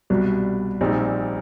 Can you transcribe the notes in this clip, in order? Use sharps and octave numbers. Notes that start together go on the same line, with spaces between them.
C2 B2 G3
A#1 A#2 G3 C4 D#4